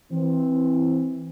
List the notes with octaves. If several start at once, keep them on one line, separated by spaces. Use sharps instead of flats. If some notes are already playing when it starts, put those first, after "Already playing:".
E3 C4